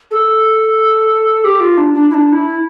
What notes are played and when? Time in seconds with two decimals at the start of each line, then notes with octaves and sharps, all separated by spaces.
0.11 A4
1.44 G4
1.60 F4
1.77 D4
1.94 D4
2.10 E4
2.14 D4
2.32 E4